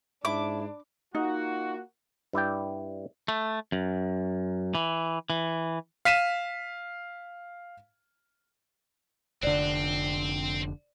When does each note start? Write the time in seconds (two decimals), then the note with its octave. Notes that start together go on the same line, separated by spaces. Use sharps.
0.25 G#2 D4 E4 D6
1.15 A#3 D#4 F4 F#4
2.33 G2 E4 D5 G5
3.28 A3
3.72 F#2
4.75 E3
5.30 E3
6.05 F5 B6 D#7 E7
9.43 F1 D3 C4 C5 D5